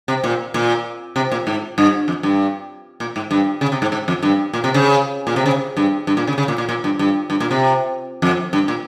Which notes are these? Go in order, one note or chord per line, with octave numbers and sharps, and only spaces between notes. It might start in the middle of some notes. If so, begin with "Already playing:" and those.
C3
A#2
A#2
C3
A#2
G#2
G2
F2
G2
A#2
G#2
G2
C#3
C3
G#2
G#2
F2
G2
A#2
C3
C#3
A#2
C3
C#3
G2
G2
A#2
C#3
C#3
A#2
A#2
A#2
G2
G2
G2
A#2
C3
F2
G2
A#2